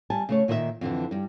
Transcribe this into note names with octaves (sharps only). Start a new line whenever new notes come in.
G3 G#5 A5
C#3 A3 C#5
A#2 D#3 D#4 B4 E5
F2 D3 E3
G2 G3